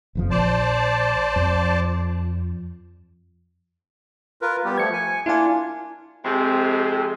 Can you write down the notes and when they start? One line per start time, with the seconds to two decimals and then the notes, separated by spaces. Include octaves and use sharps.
0.15 F#1 F2 F3
0.31 A#1 C5 D5 A5
1.36 F2
4.42 F4 A#4 B4
4.65 G3 B3 G4
4.78 F3 A3 G#6 C#7
4.93 G#5
5.26 A#3 D4 E4 F4 G#5
6.25 F2 C3 G#3